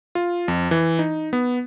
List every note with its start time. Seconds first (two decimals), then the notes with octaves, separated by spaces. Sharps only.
0.15 F4
0.48 F2
0.71 E3
0.99 D#4
1.33 B3